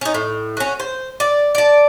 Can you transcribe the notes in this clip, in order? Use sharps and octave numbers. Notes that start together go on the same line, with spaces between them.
C#4 D#4
A2
C#4 F#4
C5
D5
D5 A5